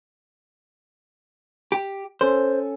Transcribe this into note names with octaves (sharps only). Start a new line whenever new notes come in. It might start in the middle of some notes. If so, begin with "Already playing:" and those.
G4
C#4 A4 C5